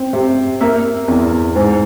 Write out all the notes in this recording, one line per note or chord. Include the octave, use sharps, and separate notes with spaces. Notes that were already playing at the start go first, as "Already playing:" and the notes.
Already playing: C4
C3
A#3 E5
E2
G#2